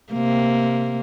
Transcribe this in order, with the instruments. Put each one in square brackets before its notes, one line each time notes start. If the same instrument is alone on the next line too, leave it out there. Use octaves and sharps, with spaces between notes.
[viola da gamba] C3 A#3